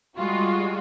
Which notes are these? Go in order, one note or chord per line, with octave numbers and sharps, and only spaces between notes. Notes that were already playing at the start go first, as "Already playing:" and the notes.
G3 G#3 F4 F#4